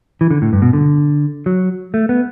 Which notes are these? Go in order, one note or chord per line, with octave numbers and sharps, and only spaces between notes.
E3
D3
A2
G2
B2
D3
F#3
A3
B3